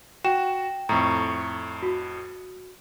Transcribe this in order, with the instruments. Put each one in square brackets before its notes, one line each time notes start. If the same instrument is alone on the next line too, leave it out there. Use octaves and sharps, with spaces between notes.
[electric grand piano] F#4 [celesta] G5 E7
[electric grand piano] F2 A2 [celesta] A#5 C#6
[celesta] F#4